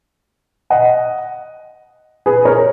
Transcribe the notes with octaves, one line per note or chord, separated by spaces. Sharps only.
D#5 F#5
G#4 B4
A#4 C#5